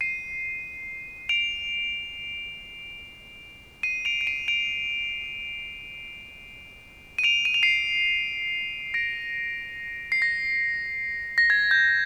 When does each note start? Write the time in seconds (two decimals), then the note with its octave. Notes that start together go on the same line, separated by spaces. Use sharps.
0.01 C7 D#7
1.29 D7 F7
3.83 C7 D#7
4.05 D7 F7
4.21 D7
4.27 C7 D#7
4.48 D7 F7
7.18 D#7
7.24 D7 F7
7.45 D#7
7.54 F7
7.63 C7 D#7
8.94 A#6 D7
10.12 C7
10.22 A#6
11.38 A#6
11.50 G#6
11.71 G6